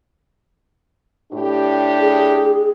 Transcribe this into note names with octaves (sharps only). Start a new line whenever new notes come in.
A2 D4 G4
G#4